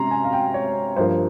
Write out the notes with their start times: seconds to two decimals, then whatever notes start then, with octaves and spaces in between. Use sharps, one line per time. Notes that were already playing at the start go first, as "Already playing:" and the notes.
Already playing: C3 C#4 A#5 C6
0.11 G#5
0.24 F5
0.32 G5
0.54 C#5
0.96 G2 F3 A#3 C5